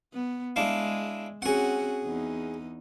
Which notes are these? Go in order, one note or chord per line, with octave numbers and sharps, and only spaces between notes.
B3
G#3 D4 E4 F5
C4 C#4 F#4 G#4 F#5
E2 D#4